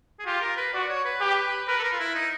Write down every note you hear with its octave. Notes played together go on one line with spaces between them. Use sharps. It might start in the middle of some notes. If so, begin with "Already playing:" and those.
G#4
F4 G4
A#4
B4
F#4 D5
C#5
B4
G4
A#4 B4
A4
A#4
F4
E4
D#4